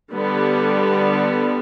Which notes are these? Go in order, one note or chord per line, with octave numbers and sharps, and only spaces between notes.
D3 G3 B3